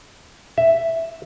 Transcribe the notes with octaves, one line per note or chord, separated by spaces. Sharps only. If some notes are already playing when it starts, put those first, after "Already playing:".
E5